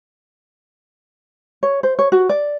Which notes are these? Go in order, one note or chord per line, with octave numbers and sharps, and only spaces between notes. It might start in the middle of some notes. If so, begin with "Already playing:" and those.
C#5
C5
C#5
F#4
D5